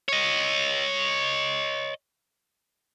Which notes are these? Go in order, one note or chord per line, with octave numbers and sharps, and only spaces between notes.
C#5 D#5